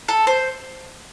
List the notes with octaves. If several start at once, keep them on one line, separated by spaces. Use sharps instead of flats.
A4
C5